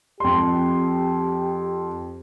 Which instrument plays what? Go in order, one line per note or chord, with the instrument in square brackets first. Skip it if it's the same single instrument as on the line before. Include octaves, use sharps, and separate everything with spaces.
[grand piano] F2 C6 [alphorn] G4